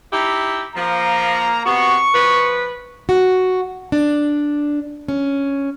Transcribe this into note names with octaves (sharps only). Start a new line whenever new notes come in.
D#4 E4 G4
F3 A#3 A#5
C3 B3 F#4 C#6
F3 B4
F#4
D4
C#4